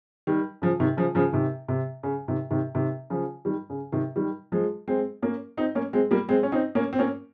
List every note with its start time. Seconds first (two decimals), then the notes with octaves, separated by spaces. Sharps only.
0.27 D#3 G3
0.62 C#3 F3
0.80 C3 D#3
0.97 C#3 F3
1.15 C#3 F3
1.33 C3 D#3
1.68 C3
2.03 C#3
2.28 C3 D#3
2.51 C3 D#3
2.75 C3 D#3
3.10 C#3 F3
3.45 D#3 G3
3.70 C#3
3.92 C3 D#3
4.16 D#3 G3
4.52 F3 G#3
4.88 G#3 C4
5.22 A#3 C#4
5.57 C4 D#4
5.75 A#3 C#4
5.93 G#3 C4
6.11 G3 A#3
6.29 G#3 C4
6.43 C#4
6.52 C4 D#4
6.75 A#3 C#4
6.93 C4
6.99 A#3 C#4